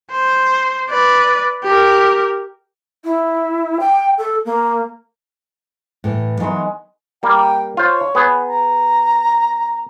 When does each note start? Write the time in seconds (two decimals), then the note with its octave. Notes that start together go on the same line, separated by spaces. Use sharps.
0.11 C5
0.90 B4 D5
1.64 G4 A#4
3.04 E4
3.80 G5
4.18 A4
4.45 A#3
6.04 A2 E3
6.40 D#3 E3 F#3 G#3 B3
7.23 G3 A#3 G5
7.77 F4 C5 C#5
8.15 B3 G#4
8.47 A#5